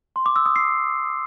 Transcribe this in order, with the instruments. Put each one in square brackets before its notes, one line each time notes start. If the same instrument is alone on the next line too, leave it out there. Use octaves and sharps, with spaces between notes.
[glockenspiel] C6
D6
E6
D#6
C7